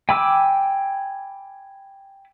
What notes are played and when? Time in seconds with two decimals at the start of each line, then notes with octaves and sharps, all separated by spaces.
0.09 G5 G#5 B5 D6 E6